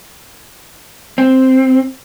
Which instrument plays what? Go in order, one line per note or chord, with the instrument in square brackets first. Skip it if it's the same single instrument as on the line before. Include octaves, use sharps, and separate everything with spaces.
[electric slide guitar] C4